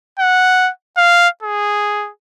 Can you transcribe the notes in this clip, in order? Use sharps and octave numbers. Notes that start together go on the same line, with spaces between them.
F#5
F5
G#4